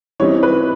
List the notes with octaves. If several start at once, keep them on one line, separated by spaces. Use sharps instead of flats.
E3 G3 C4 D#4 C#5
B4